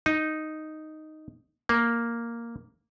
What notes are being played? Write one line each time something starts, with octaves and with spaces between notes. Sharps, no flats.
D#4
A#3